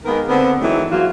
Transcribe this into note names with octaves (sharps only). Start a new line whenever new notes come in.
D#3 G#3 A#3 B3 A#4
D3 B3 C4
D#3 E3 F#3 G#3 A3
F3 F#3 G#3 A#3 F4 F#4